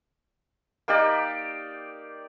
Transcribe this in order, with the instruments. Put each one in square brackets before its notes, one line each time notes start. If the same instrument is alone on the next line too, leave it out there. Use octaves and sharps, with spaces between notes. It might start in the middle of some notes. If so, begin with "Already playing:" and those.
[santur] A#3 D#4 G4 D5